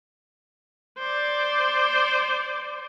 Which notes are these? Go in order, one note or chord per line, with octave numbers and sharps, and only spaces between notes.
C5 D5